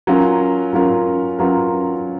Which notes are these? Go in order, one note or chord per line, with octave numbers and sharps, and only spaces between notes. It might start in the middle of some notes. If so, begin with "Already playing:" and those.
F#3 C#4 F4 A#4
F#3 C#4 F4 A#4
F#3 C#4 F4 A#4